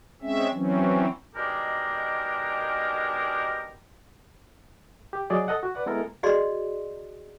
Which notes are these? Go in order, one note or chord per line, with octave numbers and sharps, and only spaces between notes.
G#3 C4 C#4 E5
E3 F#3 C4 C#4
B2 D#3 G#3 D4 G4 A#4
G4
F#3 G#4 D5 D#5
A4 D#5 F#5
F#4
B4 D5 F#5
G#3 B3 E4 A4 A#4
F#4 G#4 D5 D#5 C6